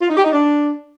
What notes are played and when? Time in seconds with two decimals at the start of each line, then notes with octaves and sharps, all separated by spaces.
0.01 F4
0.09 D#4
0.17 G4
0.25 D#4
0.33 D4